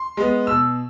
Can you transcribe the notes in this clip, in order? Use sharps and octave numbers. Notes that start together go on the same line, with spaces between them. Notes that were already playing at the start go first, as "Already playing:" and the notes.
Already playing: C6
G#3 B3
B2 E6